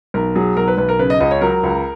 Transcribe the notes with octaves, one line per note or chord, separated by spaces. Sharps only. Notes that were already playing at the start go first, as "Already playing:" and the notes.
B1 A#4
F#3 G#4
B1 A#4
B4
B1 B4
A#4
C#3 B4
D#5
C#2 D#5
C#5
F#3 A#4
C#2